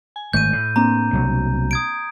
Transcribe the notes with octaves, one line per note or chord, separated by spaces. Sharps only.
G#5
G#1 A3 G6 D#7
A2
A#3 C4 D4 A#5
C2 B2 F#3
D#6 G#6 D7